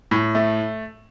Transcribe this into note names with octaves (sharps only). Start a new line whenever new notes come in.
A2
A3